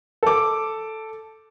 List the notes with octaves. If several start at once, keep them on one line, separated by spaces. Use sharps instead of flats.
A4 D6